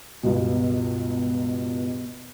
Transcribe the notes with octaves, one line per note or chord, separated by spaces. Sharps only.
C#2 G2 B2 F#4
B3